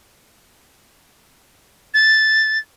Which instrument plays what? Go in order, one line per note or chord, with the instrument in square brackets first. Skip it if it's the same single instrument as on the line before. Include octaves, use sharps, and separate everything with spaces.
[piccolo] A6